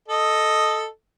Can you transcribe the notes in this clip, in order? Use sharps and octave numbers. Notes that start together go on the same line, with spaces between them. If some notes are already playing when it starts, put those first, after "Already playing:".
A4 D#5